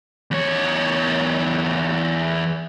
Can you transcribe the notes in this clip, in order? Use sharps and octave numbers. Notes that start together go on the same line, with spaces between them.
E2 C#5